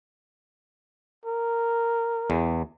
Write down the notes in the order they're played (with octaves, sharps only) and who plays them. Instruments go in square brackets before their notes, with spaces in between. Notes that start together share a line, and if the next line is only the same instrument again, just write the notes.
[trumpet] A#4
[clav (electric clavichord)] E2